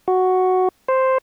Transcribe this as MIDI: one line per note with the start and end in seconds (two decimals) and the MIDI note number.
0.08 0.68 66
0.88 1.18 72